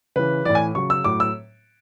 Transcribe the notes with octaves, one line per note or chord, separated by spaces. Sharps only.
C#3 E3 B4
A2 E3 D5
G#5
C#3 F#3 C#6
E6
A2 F#3 D6
E6